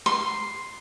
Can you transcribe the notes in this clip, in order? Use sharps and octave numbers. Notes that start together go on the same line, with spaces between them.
C6